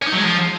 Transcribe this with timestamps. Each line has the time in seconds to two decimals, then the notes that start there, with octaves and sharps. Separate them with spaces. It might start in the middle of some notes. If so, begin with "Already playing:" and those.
0.02 C#4
0.07 D#4
0.12 F#3
0.18 G#3
0.23 F3